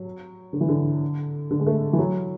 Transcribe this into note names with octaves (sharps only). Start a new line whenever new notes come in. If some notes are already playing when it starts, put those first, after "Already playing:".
Already playing: F#3
D3
E3
D3
D3
G#3
A3
E3
F#3